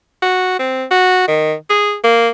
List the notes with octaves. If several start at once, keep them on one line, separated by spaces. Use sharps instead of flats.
F#4
C4
F#4
D#3
G#4
A#3